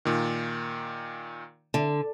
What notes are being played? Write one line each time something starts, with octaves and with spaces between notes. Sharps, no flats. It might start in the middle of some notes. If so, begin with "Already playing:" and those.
A#2 D#3
D3